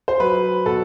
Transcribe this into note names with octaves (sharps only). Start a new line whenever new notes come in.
C5
F#3 B4
B2 A4